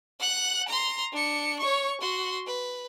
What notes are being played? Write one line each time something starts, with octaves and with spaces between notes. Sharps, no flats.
F#5 F#6
A#5 C6
D4 C#7
C#5 C#6
F#4 C6
B4